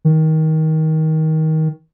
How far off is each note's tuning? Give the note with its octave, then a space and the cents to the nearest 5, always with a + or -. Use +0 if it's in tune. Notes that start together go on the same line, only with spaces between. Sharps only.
D#3 +20